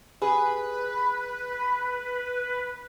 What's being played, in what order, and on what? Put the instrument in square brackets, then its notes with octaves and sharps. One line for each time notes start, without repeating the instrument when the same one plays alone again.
[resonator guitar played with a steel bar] G#4 [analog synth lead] B4